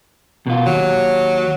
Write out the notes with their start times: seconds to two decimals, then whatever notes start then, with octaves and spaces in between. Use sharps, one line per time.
0.47 B2 F4
0.66 D#2 F#3